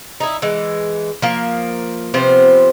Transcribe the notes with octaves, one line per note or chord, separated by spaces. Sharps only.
D#4 E4
E3 G#3
F3 A#3
C3 F3 B3 C5